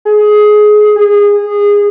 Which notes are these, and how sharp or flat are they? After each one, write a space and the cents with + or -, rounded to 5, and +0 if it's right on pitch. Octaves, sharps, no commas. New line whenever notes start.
G#4 +20
G#4 -20